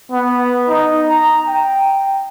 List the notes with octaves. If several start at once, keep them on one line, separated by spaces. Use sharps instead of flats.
B3
D#4
A#5
G5